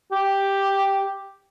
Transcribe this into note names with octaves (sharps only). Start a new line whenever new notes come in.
G4